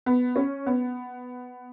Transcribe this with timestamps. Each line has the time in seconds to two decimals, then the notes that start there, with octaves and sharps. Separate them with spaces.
0.06 B3
0.36 C#4
0.66 B3